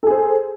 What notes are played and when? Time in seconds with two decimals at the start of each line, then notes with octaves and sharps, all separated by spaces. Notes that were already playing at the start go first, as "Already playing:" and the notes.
0.03 A4
0.07 G#4
0.10 C5